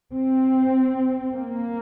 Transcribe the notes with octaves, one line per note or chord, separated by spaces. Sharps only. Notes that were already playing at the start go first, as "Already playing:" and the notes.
C4
A#3